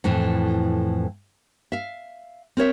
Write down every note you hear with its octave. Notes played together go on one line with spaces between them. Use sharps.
F2 A2 E3
E5 F5
C4 A#4 C#5 E5